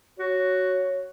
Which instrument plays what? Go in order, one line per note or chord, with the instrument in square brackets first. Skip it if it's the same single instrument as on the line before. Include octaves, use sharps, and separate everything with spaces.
[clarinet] F#4 [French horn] C#5